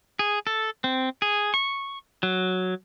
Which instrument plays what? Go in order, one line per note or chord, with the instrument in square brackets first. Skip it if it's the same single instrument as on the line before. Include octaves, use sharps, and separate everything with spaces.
[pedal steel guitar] G#4
A4
C4
G#4
C#6
F#3